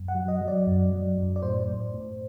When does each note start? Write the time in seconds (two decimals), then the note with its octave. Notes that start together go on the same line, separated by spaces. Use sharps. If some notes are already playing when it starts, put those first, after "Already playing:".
Already playing: F#2
0.08 F#5
0.15 F#3
0.28 D#5
0.41 F#3
0.48 D5
0.67 F#2
0.91 F#3
1.18 F#2
1.36 D5
1.42 A2 C5
1.69 A2
1.94 A2